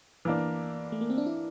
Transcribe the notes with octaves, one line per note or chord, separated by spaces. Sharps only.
E3 A#3 D4
A3
A#3
C4
D4
E4